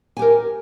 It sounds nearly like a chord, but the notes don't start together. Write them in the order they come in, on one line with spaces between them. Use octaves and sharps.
G#5 G4 A#4